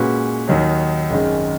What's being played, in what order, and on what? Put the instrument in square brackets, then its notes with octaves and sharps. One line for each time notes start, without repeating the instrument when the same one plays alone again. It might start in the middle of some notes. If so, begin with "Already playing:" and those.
Already playing: [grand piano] A#2 G#3 C#4 F#4 B4
D#2 D#3 F#3
G#1 F#2 D#3 G#3